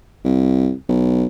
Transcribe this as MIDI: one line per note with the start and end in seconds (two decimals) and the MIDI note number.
0.24 0.72 36
0.88 1.26 35